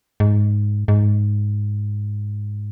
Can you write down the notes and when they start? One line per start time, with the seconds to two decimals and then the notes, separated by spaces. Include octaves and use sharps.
0.20 G#2
0.88 G#2